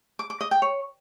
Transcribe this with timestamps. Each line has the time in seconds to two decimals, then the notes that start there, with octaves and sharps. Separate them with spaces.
0.19 D6
0.30 D6
0.41 D#5
0.51 G5
0.62 C#5